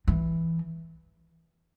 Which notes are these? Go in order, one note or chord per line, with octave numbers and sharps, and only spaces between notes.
E3